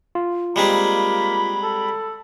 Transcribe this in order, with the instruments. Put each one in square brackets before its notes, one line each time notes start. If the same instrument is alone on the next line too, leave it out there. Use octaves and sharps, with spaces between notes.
[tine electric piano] F4
[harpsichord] G3 G#3 C4 [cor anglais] A#3 [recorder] B5
[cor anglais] A4